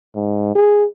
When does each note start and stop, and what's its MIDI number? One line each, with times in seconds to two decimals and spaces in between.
0.16 0.53 44
0.55 0.85 68